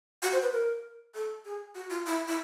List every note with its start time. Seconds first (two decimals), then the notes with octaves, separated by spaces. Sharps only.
0.22 F#4
0.33 C5
0.42 B4
0.52 A#4
1.14 A4
1.45 G#4
1.75 F#4
1.90 F4
2.06 E4
2.28 E4